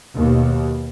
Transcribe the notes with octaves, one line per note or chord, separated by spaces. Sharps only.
D#2 B2